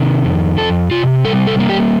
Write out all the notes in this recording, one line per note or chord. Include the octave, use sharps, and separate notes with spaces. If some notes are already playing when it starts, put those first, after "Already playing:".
Already playing: C3 D#3
F2
F2 A4
C3 F4
G3 A4
A4
A#3
G4